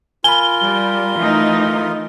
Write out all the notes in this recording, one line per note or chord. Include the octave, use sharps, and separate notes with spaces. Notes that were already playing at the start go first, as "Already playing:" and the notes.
F4 A#4 G#5 B5 G7
G3
E3 A3 D#4